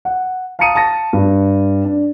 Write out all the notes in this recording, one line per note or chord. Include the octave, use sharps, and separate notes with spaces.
F#5
F5 A5 A#5 D#6 C#7 D#7
A5 A#6
G2
D4